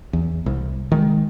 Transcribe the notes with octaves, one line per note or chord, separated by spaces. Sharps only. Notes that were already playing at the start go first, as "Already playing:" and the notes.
E2
C2
D#3 G#3